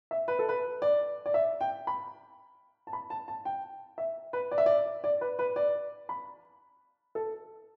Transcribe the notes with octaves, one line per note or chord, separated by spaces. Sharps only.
E5
B4
A4
B4
D5
D5
E5
G5
B5
A5
B5
A5
A5
G5
E5
B4
D5
E5
D5
D5
B4
B4
D5
B5
A4